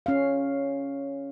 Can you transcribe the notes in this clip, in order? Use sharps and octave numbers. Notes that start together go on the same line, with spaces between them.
C#4 F5